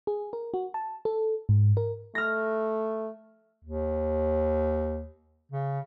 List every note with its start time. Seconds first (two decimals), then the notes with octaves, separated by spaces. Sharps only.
0.07 G#4
0.33 A#4
0.54 F#4
0.74 A5
1.05 A4
1.49 G#2
1.77 A#4
2.15 A3 F6 A#6
3.64 D#2
5.52 C#3